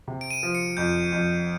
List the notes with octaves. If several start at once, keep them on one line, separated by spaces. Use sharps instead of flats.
C3
D7
D#7
F3
C#7
F2 G6
F2